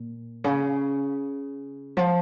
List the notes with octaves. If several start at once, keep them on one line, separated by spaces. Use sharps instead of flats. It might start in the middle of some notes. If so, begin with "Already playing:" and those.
Already playing: A#2
C#3
F3